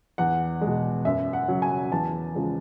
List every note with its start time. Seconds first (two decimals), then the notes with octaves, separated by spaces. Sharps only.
0.18 E2 F#5
0.61 G#3
0.67 B2
1.05 F#2 E5
1.33 F#5
1.48 C#3 F#3
1.62 G#5
1.92 E2 A5
2.35 C#3 F3 G#3